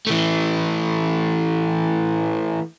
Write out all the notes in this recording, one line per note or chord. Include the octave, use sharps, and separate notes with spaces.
E3 A3